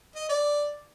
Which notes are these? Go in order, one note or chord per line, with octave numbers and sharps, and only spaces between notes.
D#5
D5